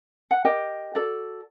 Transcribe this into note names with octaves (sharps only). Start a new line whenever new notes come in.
F#5
G4 A#4 D#5 G5
F#4 A4 D5